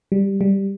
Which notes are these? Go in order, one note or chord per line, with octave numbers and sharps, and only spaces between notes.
G3
G3